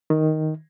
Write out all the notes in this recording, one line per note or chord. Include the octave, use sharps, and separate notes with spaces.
D#3